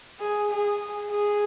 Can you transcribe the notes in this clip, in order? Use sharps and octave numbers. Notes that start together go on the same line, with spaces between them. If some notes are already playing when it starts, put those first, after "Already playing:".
G#4
G#4
G#4